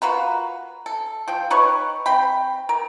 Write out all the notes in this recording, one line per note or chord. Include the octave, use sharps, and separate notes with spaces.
F4 F#4 A#4 B4
A4
F3 G5
D#4 B4 C#5 C#6
C4 G5 B5
A#4